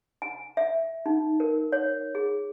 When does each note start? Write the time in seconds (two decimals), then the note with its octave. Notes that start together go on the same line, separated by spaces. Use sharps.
0.22 G#5
0.57 E5
1.06 D#4
1.40 A#4
1.72 C#5
2.15 G#4